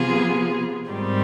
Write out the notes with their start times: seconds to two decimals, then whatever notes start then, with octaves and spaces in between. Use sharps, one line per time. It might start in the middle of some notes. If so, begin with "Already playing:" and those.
Already playing: C3 F3 B3 F4 G#4
0.90 G#2 D#3 G3 C4 G4